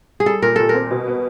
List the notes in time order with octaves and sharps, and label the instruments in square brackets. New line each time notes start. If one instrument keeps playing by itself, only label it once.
[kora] G#4
[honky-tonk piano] G3 [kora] A4
[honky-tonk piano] A#2 [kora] A#4
[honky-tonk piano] A#2 [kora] A4
[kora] A#4
[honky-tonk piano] C4
B2
B3